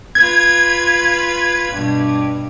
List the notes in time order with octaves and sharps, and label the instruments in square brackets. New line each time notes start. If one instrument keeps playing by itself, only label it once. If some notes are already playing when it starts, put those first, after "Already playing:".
[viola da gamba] F4 B4 [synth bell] G#6
[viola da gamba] G2 B2